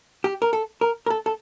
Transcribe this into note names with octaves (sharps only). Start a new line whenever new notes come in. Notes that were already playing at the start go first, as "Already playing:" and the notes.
G4
A#4
A4
A#4
A#4
A4
A4